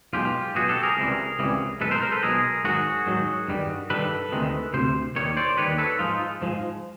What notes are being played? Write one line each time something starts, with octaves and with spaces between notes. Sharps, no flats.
B1 B2 G#3 F4 G4
B1 B2 G#3 F#4 G#4
G4 A4
G#4 A#4
C#2 C3 E3 G3
C#2 C3 E3 G3
B1 B2 G#3 A4 B4
A#4 C5
A#4 C5
A4 B4
B1 B2 G#3 G#4 A#4
G#2 D#3 F#3 F#4 G#4
G#2 D#3 F#3
G2 D#3 G3
G2 D#3 G3 A4 B4
D2 C3 D#3 G#3
D2 C3 C5
D#2 D#3 G3 C#5
C5 D5
D#2 D#3 G3 B4 C#5
A4 B4
G#2 F3 G#3 D#4 F4
G#2 F3 G#3